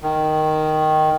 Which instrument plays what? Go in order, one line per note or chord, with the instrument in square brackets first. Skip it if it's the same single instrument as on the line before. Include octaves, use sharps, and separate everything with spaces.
[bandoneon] D#3